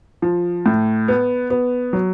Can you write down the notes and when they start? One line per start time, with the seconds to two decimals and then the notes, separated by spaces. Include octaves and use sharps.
0.22 F3
0.66 A2
1.08 B3
1.50 B3
1.93 F#3